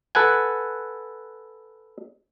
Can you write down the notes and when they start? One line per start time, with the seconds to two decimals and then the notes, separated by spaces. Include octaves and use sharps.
0.15 A4 B4 F#5 G#5